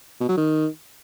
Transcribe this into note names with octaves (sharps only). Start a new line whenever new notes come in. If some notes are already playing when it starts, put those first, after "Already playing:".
B2
F#3
D#3